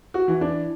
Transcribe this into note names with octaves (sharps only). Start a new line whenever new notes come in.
F#4
E3
D4